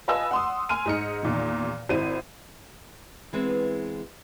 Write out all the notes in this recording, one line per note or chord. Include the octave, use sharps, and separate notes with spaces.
F4 B4 D#5 G#5 A5 E6
F#5 C6 D#6
G#5 C6 F6 D#7
G#2 D#4 C#7
E2 A#2 D#3
G#1 C4 E4 D#7
E3 G#3 B3 C4